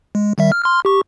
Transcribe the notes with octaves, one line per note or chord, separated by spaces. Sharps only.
G#3
D#3 G3 E5
F6
C6 F6
G4 C#6